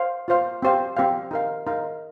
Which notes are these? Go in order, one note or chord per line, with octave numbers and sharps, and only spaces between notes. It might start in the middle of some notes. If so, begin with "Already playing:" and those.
Already playing: C5 F5
F4 C5 F5
C4 G4 C5 F5
C4 G4 C5 F5
D#4 A#4 F5
D#4 A#4 F5